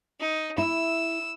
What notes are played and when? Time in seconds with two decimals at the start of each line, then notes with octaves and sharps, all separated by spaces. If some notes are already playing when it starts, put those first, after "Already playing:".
0.21 D#4
0.58 E4 E6